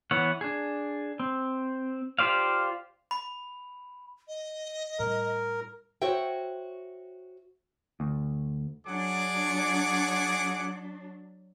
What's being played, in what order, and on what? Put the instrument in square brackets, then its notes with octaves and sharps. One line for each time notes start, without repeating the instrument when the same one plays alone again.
[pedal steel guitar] E3 B3 C#5 F#5
D4 G#4
C4
F4 G4 C5 D5 F5
[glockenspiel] B5
[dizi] D#5
[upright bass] A2 G3 [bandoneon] A#4
[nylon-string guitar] F#4 C5 C#5 E5 G5
[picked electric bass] D2
[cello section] F#3 D4 [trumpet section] G#4 F#5 D6